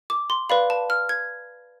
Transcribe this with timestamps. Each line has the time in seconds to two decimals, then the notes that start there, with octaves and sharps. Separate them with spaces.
0.10 D6
0.30 C6
0.50 B4 D5 F5 B5
0.70 A5
0.90 F6
1.09 G#6